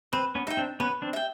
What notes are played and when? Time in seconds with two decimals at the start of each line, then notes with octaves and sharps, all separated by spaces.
0.13 C4 B4
0.35 B3 C#4
0.47 D#4 E5 G5
0.57 C4 D4
0.80 B3 C#4 B4
1.02 C4 D4
1.13 E5 G5